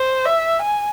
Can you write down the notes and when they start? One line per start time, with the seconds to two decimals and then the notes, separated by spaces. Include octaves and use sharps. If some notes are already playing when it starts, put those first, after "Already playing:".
Already playing: C5
0.25 E5
0.62 G#5